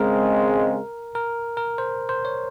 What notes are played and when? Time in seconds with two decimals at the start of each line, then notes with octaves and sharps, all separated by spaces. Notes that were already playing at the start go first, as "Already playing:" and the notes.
Already playing: C#3 G#3 C4 A#4
1.15 A#4
1.57 A#4
1.78 C5
2.09 C5
2.25 C#5